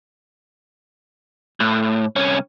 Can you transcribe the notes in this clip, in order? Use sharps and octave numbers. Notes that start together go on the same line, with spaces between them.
A2
C2 C#4